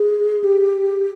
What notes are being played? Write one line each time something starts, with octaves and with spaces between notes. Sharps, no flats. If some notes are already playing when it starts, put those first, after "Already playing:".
Already playing: G#4
G4